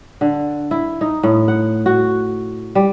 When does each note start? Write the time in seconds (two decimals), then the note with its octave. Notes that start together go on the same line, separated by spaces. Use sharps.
0.21 D3
0.71 E4
1.01 D#4
1.23 A2
1.48 F#5
1.86 F#4
2.75 G3